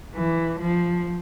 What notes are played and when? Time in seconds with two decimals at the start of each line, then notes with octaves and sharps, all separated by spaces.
0.15 E3
0.60 F3